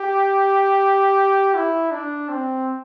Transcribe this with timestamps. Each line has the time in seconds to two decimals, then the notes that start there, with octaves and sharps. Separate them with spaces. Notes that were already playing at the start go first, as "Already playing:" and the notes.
Already playing: G4
1.55 E4
1.92 D4
2.29 C4